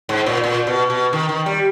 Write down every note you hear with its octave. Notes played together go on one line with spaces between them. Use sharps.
G#2
A#2
A#2
B2
B2
D#3
D#3
G3